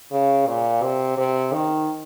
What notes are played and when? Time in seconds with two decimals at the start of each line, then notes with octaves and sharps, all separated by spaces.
0.11 C#3
0.47 A#2
0.83 C3
1.18 C3
1.53 D#3